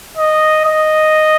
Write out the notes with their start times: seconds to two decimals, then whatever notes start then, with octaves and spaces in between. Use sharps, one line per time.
0.17 D#5
0.65 D#5